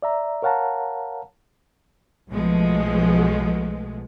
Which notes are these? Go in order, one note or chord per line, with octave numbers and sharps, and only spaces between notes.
D5 E5 A#5
A#4 C#5 F5 F#5 A5 A#5
B1 B2 F3 G#3 A3